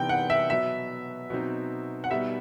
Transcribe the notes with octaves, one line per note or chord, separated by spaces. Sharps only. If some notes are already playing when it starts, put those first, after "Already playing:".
Already playing: C3 E3 B3 D#4 G5
F#5
E5
B2 F#3 B3 E5
B2 F#3 C4 D#4
F#5
B2 G3 B3 D#4 E5